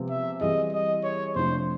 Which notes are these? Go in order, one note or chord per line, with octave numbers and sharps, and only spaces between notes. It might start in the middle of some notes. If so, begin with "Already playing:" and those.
Already playing: C3 F3 G#3 B3
E5
E3 G3 C4 E4 G#4 D#5
D#5
C#5
F2 C3 F3 A3 D4 C5